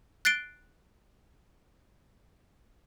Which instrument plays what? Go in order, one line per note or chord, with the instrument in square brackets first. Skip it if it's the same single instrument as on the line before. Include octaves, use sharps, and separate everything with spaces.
[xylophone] F#6 A6 C7 D7 G7